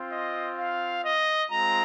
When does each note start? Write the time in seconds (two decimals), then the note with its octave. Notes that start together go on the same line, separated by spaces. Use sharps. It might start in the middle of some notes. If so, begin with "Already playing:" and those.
Already playing: C4 F4
0.12 D#5
0.58 F5
1.04 D#5
1.50 G#3 C4 F4 A#5